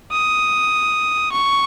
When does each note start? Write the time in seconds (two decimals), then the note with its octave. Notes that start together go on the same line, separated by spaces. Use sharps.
0.11 D#6
1.32 C#6